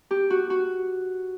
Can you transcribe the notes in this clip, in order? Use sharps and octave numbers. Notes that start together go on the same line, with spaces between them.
G4
F#4
F#4